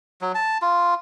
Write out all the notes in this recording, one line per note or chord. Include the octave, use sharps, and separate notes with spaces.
F#3
A5
F4